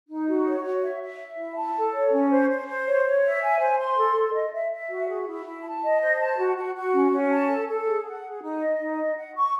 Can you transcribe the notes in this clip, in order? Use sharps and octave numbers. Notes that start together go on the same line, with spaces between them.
D#4
F#4
C#5
F#4
E5
E5
E5
E4
A5
A4
C#5
C#4
C5
C5
C5
C#5
C#5
E5
G#5
C5
C6
A4
A4
D#5
E5
E5
F#4
G#4
E4
E4
A5
D#5
C5
A5
F#4
F#4
F#4
C#4
C#4
A5
A4
A4
G#4
F#5
G#4
D#4
D#5
D#4
D#5
F#5
C#6